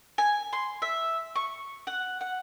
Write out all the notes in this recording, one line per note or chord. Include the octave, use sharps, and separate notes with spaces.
G#5
C6
E5
C#6
F#5
F#5